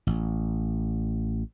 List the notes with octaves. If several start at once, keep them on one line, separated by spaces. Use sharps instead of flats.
A1